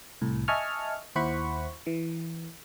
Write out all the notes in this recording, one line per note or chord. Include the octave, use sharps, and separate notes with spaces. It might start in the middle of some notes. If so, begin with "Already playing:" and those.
C2 A2
D#5 E5 G#5 A5 C#6 F6
D#2 E4 C5 F#5 B5 C#6
E3